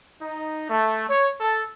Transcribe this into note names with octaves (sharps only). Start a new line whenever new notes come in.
D#4
A3
C#5
A4